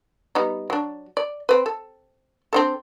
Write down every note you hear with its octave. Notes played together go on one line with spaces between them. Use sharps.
G3 B3 D#4
F#3 D4
D5
C4 B4
A4
C4 D4 A4